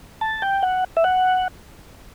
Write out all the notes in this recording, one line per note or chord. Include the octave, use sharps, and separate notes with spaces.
A5
G5
F#5
E5
F#5